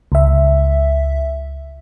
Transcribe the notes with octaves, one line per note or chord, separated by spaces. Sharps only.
C#2 E5